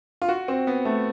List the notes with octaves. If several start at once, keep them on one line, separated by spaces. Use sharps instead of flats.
F4
F#4
C4
B3
A3